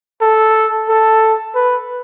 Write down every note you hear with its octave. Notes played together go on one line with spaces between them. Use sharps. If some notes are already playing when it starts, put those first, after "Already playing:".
A4
A4
B4